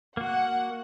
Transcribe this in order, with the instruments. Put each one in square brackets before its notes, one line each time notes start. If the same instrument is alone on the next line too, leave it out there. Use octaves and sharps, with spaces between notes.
[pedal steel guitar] A#3 F#4 [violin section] F#5